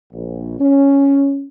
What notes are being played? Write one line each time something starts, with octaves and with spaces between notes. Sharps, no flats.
A#1
C#4